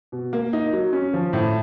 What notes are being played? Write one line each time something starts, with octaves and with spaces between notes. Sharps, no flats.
B2
A#3
D#4
F#3
C#4
F3
A2